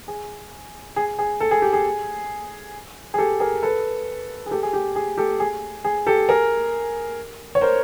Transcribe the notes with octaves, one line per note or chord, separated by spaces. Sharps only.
G#4
G#4
G#4
A4
G#4
G4
G#4
G#4
G4 A4
G#4 A#4
A4 B4
G#4
G4 A4
G#4
G4
G#4
G4 A4
G#4
G#4
G4 A4
G#4 A#4
C#5
A#4 C5